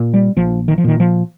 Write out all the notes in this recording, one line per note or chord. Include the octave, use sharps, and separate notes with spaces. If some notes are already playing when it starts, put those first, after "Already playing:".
Already playing: A#2
G3
A#1 F3
D#3
F3
A#2 D#3
F3